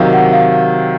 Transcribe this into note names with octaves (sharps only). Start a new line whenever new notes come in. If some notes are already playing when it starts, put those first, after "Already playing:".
Already playing: C3 D#3 F#3 E5 F5
F#5
F5
F5